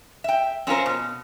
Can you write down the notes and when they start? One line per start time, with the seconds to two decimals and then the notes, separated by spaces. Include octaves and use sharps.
0.24 E5 G5
0.67 C4 C#4 F4 A#4 C5
0.86 B2